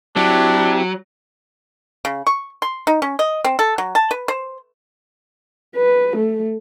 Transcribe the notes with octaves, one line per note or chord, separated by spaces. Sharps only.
F#3 C4 D4 E4 G4
C#3
C#6
C6
D#4
C#4
D#5
C4
A4
F#3
A5
B4
C5
B4
A3